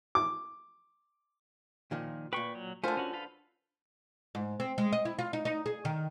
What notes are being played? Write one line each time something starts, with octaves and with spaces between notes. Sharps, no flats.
D6
A#2 D#3 F3
A#2 B4 G5 C#6
F#3
D3 A3 F4 A#4 C5 G#5
C#4 F#4
A4 B4 F5
G#2
C4
G#3
D#5
E4
F4
D#4
D#4
G#4
D#3